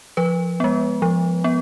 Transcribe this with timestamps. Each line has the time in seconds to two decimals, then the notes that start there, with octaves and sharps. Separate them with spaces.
0.17 F3 B4
0.60 G#3 B3
1.02 F3
1.44 B3